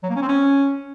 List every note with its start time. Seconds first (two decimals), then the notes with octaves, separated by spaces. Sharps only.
0.03 F#3
0.10 A#3
0.16 C#4
0.22 C4
0.28 C#4